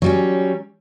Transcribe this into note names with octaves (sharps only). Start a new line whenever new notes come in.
F#3 G3 C#4